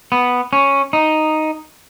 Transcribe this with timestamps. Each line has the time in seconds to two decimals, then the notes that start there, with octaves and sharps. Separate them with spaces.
0.12 B3
0.53 C#4
0.93 D#4